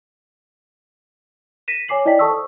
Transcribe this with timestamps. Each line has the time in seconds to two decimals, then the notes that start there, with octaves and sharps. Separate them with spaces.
1.68 A#6 B6 D#7 E7
1.88 C#5 G#5 D6 C7 F#7
2.05 E4 D5 D#5 G5 B6
2.19 A4 A5 C#6 D#6 E6
2.31 C5